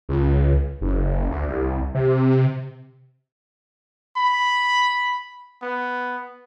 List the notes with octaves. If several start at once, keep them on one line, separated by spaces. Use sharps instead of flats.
C#2
F#1
D2
C2
C3
B5
B3